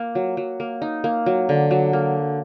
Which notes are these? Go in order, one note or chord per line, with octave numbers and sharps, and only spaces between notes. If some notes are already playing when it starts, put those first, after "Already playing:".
Already playing: A#3
F#3
F#3
A#3
D#4
A#3
F#3
D3
F#3
A#3